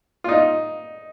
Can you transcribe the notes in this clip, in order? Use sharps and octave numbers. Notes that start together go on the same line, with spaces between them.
F4
D#4